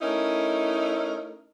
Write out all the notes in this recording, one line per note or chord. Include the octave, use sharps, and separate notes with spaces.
A3 C#4 D#4 E4 A#4